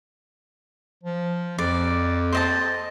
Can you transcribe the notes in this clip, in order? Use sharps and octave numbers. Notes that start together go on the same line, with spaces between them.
F3
F2 D5
C5 D#5 A5